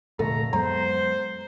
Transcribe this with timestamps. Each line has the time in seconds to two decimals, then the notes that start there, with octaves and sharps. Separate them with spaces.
0.19 F1 D2 A#2 A3 A4 A#5
0.53 F#2 F#3 G#3 B3 C5 A#5